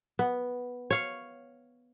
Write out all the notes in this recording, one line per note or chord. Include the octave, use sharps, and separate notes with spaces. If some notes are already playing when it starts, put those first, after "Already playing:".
B3
C#5 F5